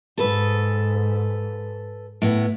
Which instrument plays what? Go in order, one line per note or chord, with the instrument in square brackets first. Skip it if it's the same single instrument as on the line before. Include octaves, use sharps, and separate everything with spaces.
[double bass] G#2 [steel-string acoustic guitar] A4 B4
[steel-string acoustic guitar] A2 B3